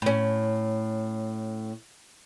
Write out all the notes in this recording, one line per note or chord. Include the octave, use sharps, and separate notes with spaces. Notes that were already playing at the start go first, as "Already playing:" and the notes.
A2 C#4